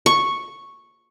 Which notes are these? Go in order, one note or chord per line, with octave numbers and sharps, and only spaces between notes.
C#6